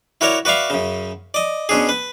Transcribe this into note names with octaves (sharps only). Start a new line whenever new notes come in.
E4 F#4 A#4 C#5 D5
F#4 B4 D5 E5 F5
F#2 C#3
D5 D#5
B2 C#4 D4 G#4
B4